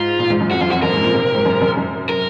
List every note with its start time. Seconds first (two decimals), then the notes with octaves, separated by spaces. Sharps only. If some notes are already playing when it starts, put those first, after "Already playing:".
Already playing: G#2 F4
0.19 A#2
0.30 G#2
0.41 F#2
0.51 F2 F#4
0.61 F#2 F4
0.70 F2 F#4
0.82 F#2 A#4
0.93 G#2
1.04 A#2
1.14 C3
1.25 C3
1.35 G#2
1.45 F#2
1.62 F#2
1.77 F#2
2.09 A#4